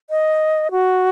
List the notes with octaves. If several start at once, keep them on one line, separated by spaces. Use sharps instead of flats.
D#5
F#4